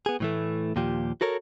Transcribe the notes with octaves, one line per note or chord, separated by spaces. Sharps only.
B3 G#4
A2 E3 A3
D#2 A#2 F3 G4
F#4 A4 A#4 C#5